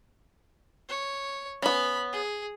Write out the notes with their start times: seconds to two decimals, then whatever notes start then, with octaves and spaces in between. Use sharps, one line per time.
0.89 C#5
1.62 B3 C#4 B5
2.13 G#4